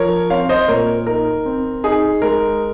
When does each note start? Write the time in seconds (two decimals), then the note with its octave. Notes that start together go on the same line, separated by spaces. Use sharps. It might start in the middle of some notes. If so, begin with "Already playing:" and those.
Already playing: F3 A#4 C#5
0.30 C4 C#5 F5
0.49 C5 D#5
0.68 A#2 A#4 C#5
1.07 D#4 A#4
1.46 C4
1.84 D#4 G#4
2.22 G#3 A#4